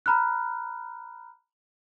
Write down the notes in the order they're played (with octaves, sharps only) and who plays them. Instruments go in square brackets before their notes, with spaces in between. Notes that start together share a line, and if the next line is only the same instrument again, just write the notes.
[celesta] A#5 B5 F6 F#6